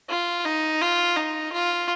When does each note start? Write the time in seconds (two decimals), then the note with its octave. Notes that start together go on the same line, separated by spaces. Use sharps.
0.10 F4
0.45 D#4
0.81 F4
1.16 D#4
1.52 F4